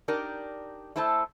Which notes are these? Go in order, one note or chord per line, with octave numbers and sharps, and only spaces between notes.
D4 D#4 G4 A#4 D5
A3 E4 A4 C5 A5